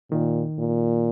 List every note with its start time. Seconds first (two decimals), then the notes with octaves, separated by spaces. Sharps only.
0.11 A#2 D#3
0.58 A#2